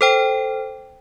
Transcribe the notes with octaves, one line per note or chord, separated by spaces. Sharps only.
A4 C5 G5